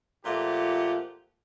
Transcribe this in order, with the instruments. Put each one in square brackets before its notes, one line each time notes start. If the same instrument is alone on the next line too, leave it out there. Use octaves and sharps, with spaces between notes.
[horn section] A#2 F3 A3 F4 G4 F#5